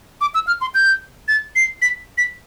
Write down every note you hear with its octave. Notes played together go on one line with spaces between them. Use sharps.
D6
E6
F6
C6
G6
A6
C7
B6
B6